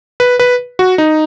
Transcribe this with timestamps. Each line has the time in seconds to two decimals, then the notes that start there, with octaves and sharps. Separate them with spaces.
0.20 B4
0.39 B4
0.79 F#4
0.98 D#4